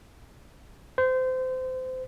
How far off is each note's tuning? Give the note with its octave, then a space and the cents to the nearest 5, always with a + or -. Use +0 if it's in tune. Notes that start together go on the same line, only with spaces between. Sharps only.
C5 -25